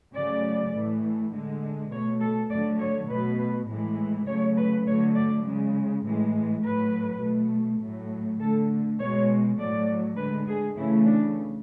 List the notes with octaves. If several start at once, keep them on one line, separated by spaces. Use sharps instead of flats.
C#3 F#3 A3 D5
A2 E3 A3
D3 G#3
B2 A3 C#5
A4
D3 F#3 A3 D5
C#5
B2 A3 B4
A2 E3 G#3
C#3 F#3 A3 C#5
B4
D3 F#3 A3 C#5
D5
C#3 G#3
A2 E3 G#3
A2 F#3 A3 B4
B2 A3
A2 F#3 A3
D3 A3 A4
B2 G#3 C#5
A2 F#3 A3 D5
D3 G#3 B4
G#4
C#3 E3 A3 E4
D4